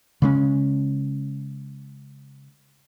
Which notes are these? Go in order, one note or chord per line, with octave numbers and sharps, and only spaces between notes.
C#3 G#3 C#4